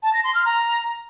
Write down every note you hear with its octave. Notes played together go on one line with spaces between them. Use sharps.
A5
A#6
C6
F6
A#5